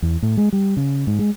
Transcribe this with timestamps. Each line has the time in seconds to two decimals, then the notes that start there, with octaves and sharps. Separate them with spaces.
0.02 E2
0.23 A2
0.37 G#3
0.53 G3
0.77 C#3
1.07 G#2
1.19 G#3